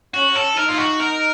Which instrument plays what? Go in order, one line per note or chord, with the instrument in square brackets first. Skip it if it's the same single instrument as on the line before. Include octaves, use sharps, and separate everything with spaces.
[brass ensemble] C#4 [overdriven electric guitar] F#4
[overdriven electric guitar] A4
[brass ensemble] D#4 [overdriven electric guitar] A#4
[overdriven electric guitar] F4
F#4
A#4